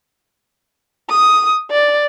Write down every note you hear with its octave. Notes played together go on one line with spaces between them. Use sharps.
D#6
D5